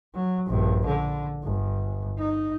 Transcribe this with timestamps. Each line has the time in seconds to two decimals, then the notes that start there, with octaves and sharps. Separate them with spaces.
0.15 F#3
0.47 A#1 G2
0.86 D3
1.44 G1
2.19 D#4